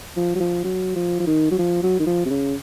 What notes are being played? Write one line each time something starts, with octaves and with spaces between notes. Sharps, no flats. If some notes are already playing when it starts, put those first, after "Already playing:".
F3
F#3
F3
F#3
F3
F3
D#3
F#3
F3
F#3
D#3
F3
C3
C#3